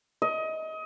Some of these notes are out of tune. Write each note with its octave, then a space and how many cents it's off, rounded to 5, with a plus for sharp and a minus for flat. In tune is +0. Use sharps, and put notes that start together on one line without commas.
D#5 +25